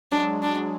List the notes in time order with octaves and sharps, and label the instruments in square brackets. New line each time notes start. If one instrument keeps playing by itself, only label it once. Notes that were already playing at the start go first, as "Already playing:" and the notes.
[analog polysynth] F#3 G#3 [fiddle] D4
[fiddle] D4